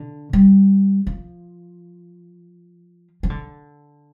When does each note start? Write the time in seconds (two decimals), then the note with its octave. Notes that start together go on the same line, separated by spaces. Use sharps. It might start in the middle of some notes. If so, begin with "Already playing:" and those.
Already playing: D3
0.33 G3
1.07 F3
3.23 F3
3.30 D3